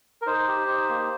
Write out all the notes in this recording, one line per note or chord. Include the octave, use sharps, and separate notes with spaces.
A#4
D#4 C5
G4
D#4
A#3